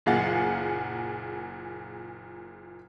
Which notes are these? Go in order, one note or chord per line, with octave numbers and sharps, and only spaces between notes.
F#1 A#2 G#4 F5 F#5 A6